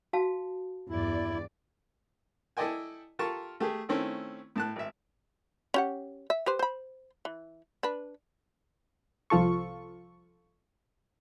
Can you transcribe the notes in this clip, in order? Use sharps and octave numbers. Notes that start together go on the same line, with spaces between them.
F#4 F5 A5
E2 G2 E4 D5
E4 A4 D5 D#5 G5 G#5
F4 G4 A4 A#4 A5 C#6
A3 G4 G#4
D#3 A3 C4 C#4 E4
A2 A5 F#6
G#1 E5
C#4 G4 F#5
E5
G4 B4 C5
C5 B5
E3
D4 B4
C2 F3 F4 A4 C#6